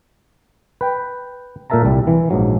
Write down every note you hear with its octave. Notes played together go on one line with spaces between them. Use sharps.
B4 G5
A#2 A4 A#4 E5 A5 A#5
C2 G3
E3
A#1 G#2 F#3